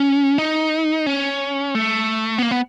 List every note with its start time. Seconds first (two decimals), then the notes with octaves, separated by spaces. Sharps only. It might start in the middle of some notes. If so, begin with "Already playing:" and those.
Already playing: C#4
0.38 D#4
1.06 C#4
1.75 A3
2.38 B3
2.42 A#3
2.51 B3